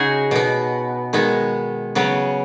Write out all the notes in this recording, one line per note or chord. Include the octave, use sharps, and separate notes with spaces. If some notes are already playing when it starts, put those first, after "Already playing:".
Already playing: C#3 D#4 F#4 G#4
B2 B3
D#3 G#3 B3
C#3 F#3 B3